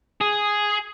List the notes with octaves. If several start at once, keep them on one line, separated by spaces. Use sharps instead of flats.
G#4